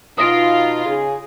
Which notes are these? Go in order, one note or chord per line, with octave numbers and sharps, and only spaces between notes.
B2 D#4 F4 D#6 A#6 D7
C#3 G#4